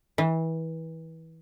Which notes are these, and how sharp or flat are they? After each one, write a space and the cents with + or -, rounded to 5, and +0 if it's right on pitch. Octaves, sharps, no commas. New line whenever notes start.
E3 -25